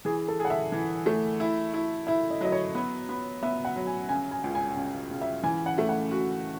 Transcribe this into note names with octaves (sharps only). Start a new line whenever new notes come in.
E3 G#4
A4
G#4
F#5
E5
E3
A3
E4
E4
E4 E5
D#5
F#3 D#5
C#5
B3
B3
B3 E5
F#5
F#3
G#5
C#3 G#5
G#5
C#2
G#5
C#3
C#3
E5
E3 G#5
F#5
A3 E5
F#5
F#4